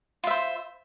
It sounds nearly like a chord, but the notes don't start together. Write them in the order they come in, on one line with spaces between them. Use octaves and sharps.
F4 E5 C5